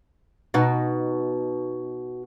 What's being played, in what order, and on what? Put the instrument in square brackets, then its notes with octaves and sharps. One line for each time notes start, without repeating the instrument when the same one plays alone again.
[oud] B2 D#4 F#4